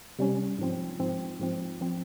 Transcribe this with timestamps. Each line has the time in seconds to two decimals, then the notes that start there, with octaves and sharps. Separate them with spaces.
0.19 C3 G3 C#4
0.59 G#2 F3 C4
0.99 G#2 F3 C4
1.39 G#2 F3 C4
1.81 F3 C4